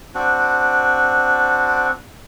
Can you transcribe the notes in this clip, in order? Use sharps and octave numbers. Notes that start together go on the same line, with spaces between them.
C4 D4 F#4